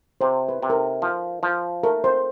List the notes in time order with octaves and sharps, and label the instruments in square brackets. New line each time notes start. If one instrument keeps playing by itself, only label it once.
[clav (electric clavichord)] C3 [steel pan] C5
[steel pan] B4
[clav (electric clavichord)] C3
[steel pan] A#4
A4
[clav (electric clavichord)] F3
F3
[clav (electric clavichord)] A3 [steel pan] A#4
[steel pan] C5